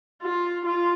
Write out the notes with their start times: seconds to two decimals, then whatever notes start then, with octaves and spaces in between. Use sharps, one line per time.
0.22 F4
0.65 F4